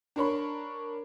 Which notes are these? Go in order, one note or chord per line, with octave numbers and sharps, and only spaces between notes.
D4 A#4 C#5 B5